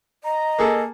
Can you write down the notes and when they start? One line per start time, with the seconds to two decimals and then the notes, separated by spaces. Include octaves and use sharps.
0.24 D#5 A#5
0.58 A#3 G#4 A4